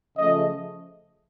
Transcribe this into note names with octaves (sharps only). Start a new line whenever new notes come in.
C#3 F3 A3 D#5